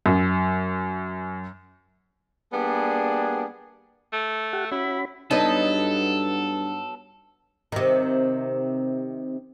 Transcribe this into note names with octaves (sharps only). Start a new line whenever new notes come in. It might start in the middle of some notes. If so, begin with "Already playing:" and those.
F#2
G3 A#3 B3 D4 G#4
A3
G4 F#5
C#4 E4 F#4 B5
G2 F#3 B3 D#4 A4 B4 D#5 A5
C3 D#3